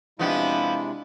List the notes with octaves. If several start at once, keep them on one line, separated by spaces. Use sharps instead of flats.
C3 F3 G#3 B3 D4 E4 F5